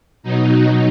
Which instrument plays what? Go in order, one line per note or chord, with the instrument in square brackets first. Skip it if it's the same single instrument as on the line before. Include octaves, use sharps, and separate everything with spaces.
[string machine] B2 F#3 D#4